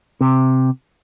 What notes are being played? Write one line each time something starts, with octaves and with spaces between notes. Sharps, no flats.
C3